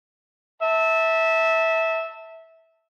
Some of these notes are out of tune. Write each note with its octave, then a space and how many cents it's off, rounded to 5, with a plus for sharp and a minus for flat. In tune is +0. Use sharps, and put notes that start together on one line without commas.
E5 -15 A5 +15